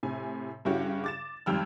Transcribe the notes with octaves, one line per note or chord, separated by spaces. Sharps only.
A2 C3 G#5
G2 C#3 C#4 E4 F#4 G4
D6 A6 E7
G#1 F2 G3 G5 E6 F6